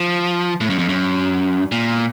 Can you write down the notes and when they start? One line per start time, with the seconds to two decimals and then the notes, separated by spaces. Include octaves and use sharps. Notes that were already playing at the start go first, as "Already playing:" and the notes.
Already playing: F3
0.61 A2
0.70 F#2
0.79 F2
0.89 F#2
1.72 A#2